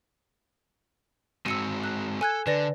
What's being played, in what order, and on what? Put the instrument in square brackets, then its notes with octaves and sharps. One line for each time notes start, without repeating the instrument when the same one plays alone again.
[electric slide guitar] G#3 C4 F#4 [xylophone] E6 C#7 D#7
[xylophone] F#6
[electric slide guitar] A4 [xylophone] G#5 F#6 G#6
[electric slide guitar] D3 [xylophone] B4 D5 A#6